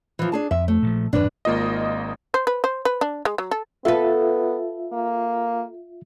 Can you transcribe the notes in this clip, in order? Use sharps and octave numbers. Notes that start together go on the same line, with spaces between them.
E3 F3
D4 G#4 A5
F2 E5
A3
A#2 D#3 F3
D#1 F#2 A2 D4 B4
G#1 A#3 F4 D#5
C5
B4
C5
B4
D4
G#3
F#3
A4
B3 F4 A4 B4 E5
A#3